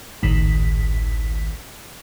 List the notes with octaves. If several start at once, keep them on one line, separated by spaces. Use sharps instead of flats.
G#1 C#2 A2 D#3 B6